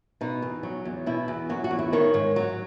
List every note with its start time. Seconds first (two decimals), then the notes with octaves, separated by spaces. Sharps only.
0.21 B2 D#4
0.42 E2
0.63 F#3
0.85 E2
1.06 B2 E4
1.28 E2
1.49 F#3 F#4
1.64 F#4
1.71 E2
1.79 E4
1.93 D#3 C#5
2.14 G#2
2.36 F#3